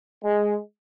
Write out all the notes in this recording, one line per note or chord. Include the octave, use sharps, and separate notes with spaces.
G#3